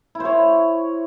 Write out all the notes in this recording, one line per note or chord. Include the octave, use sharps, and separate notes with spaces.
E4
C5
C#5